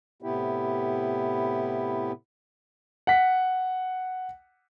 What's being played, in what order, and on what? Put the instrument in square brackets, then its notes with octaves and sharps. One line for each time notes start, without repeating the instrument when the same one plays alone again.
[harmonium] A2 C3 B3 E4 G4
[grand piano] F#5 B6